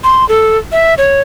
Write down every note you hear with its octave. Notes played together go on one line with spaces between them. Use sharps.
C6
A4
E5
C#5